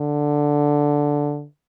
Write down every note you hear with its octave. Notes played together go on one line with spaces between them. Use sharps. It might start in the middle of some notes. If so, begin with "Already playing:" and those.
Already playing: D3